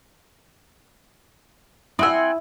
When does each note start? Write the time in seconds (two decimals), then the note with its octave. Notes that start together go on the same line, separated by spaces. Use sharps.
1.99 C4 E4 F#5 G#5 D#6 E6